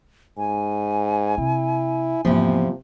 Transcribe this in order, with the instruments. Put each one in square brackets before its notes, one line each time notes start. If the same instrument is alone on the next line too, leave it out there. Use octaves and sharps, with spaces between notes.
[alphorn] G#2 [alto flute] G#5
[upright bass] C3 [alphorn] E4
[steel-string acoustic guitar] E2 F3 [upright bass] G#2 A#3 [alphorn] C3